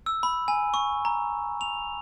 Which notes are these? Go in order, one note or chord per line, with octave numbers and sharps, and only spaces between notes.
E6
B5
G#5
C#6
A#5
F7